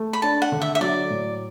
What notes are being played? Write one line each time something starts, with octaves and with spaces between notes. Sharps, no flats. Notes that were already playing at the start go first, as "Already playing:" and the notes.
Already playing: A3
B5
D4 A5
F#5
D3
E5
E5
F#3 D5
A2